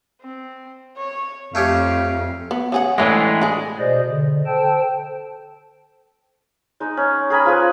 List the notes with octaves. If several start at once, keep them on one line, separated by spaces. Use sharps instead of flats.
C4
C#5
F2 A3 C#4 G4 F5
B3
C#3 G#4 F#5
A2 D3 E3 G#3 A3 C#4
D4 G#4
B2 G#4 C5 D5 D#5
D3
A4 C5 G5 A5
G#3 D#4
C#4
G#4 A#4 G#5 B5
F3 G#3 G#4 B4